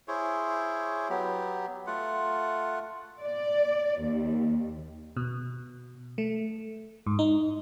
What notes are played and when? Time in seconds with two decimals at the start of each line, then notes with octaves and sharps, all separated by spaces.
0.08 E4 G#4 C5 C#5
1.09 F#3 B3 G4
1.87 A3 F4 F#5
3.20 D5
4.02 D#2
5.17 B2
6.18 A3
7.06 G#2
7.19 D#4